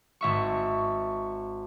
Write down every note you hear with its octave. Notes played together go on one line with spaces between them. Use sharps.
G#1 E5 C#6